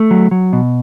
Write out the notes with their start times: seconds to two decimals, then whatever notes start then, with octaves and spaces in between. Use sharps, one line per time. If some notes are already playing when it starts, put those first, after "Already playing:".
Already playing: A3
0.11 F#3
0.31 F#3
0.53 B2